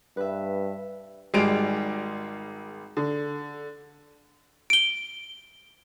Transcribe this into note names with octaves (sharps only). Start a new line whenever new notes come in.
G2 B4 E5
G#1 G3 G#3 D7 F7
D3
D7 G7